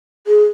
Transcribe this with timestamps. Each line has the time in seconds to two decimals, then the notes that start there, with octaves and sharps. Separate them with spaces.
0.27 G#4